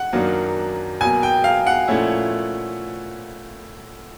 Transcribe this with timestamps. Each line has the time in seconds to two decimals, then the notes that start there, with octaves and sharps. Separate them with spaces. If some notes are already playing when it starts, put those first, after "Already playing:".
Already playing: F#5
0.13 F#2 D#3 F#3 A#3 D4
1.01 B2 F#3 A#3 G#5
1.23 G5
1.44 F5
1.67 F#5
1.88 A#2 F3 A3 C#4 E4